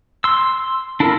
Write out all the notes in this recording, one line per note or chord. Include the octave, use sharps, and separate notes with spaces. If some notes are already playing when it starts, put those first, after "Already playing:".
C6 E6
D4 E4 F4 A4 A#4